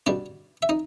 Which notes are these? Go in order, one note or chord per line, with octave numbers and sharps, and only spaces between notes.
B2 G3 D4 D5
E5
D#4 D#5